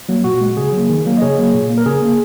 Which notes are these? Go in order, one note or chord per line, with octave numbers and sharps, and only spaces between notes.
F#3 A#3
A#2 F#4
G#3
C#3 G#4
F#3 A#3
D#3
F#3 A#3
D#5
C#3 G#4 C#5
F#3 A#3
A#2
A#3
A#4
C#3 G#4
A#3